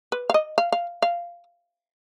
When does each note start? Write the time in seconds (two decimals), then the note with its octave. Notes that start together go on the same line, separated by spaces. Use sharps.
0.12 B4
0.30 F5
0.34 D#5
0.58 F5
0.72 F5
1.02 F5